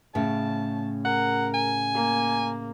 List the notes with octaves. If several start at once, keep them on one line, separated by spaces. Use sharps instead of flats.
A2 C#3 A5
A#4 F#5
G#5
A#3